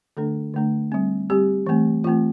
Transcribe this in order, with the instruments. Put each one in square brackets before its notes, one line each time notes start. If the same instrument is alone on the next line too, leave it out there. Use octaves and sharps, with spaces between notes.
[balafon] D3 A3 D4 A4
D3 A3 D4
G3 C4
G3 C4 G4
E3 A3 C4
E3 A3 C4 F4